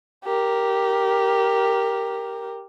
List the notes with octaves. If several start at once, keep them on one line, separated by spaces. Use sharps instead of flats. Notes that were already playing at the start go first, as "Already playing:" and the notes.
G4 A#4